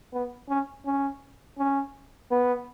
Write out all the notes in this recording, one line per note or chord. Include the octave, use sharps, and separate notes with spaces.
B3
C#4
C#4
C#4
B3